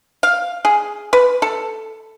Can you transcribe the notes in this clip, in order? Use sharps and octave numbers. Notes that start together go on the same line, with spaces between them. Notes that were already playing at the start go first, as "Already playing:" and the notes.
F5
G#4
B4
A4